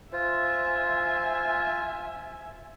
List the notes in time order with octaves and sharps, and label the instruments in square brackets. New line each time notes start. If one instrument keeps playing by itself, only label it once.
[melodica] F4 [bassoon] C5 [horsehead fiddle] E5 G#5